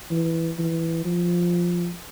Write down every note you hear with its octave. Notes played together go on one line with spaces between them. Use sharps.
E3
E3
F3